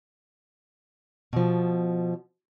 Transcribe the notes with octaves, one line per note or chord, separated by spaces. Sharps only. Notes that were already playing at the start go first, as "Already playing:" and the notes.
B2 F3